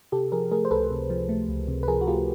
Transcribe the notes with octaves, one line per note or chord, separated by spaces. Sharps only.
C3 G4 A4
F3 G#4 A#4
A3 G#4 A#4
C5
C#2 A4 B4
C3
F3
A3
C#2
C3
B4
F3 G#4 A#4
F#4
A3 F4 G4